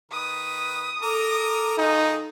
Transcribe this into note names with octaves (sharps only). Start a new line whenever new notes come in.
D#3 B4 D#6
A4 A#4 A#5 D6
D#3 D#4 F4 G#4